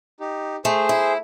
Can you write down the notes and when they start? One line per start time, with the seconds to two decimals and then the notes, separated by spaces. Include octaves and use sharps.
0.20 D#4 G4
0.65 A3 G#4 C5
0.89 E4